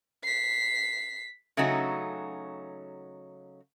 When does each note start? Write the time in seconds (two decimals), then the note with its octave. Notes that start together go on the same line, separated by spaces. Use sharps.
0.23 B6 C7
1.57 C#3 F#3 A3 C#4 D#4 F#4